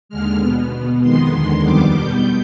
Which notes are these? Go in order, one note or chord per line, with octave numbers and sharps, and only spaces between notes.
D#2 D3 G#3 F6
B2 B3
B2 B3
F2 D#3 G#3 B3 C6
D#2 D3 G#3 C6
F2 D#3 G3 B3 D6
B2 G3 B3 G6